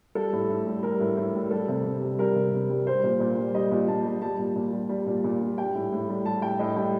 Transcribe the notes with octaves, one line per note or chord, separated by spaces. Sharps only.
G3 A4
A2
A2
G3
G3 A#4
A2
A2
G3
G3 A4
C3
C3
G3
G3 A#4
C3
C3
G3
G3 C5
A#2
A#2
G3
G3 D#5
A#2
A#2 A5
G3
G3 A5
A#2
A#2
G3
G3
A#2
A#2
G3
G3 G5
A2
A2
G3
G3 A5
A2 G5
A2 D#5
G3 G5